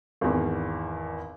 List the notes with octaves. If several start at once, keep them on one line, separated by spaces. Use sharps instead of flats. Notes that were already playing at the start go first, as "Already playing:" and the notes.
G#1 E2